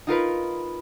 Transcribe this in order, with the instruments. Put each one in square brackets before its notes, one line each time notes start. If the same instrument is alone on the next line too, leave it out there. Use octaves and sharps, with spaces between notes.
[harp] D#4 F4 A#4 B4